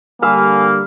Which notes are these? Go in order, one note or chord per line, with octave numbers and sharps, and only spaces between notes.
D3 G3 A#3 F5 G#5 B5 E6